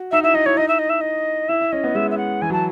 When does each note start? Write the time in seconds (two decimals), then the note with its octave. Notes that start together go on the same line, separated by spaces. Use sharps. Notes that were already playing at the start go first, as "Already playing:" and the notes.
Already playing: F#4
0.12 D#4 E5
0.23 E4 E5
0.34 D#4 D#5
0.46 E4 C#5
0.57 D#4 D#5
0.68 E5
0.79 D#5
0.90 E5
1.01 D#5
1.49 E4 E5
1.61 E4
1.72 C#4 D#5
1.84 B3
1.95 G#3 E5
2.11 E5
2.18 F#5
2.42 E3 G#5
2.50 F#3 A5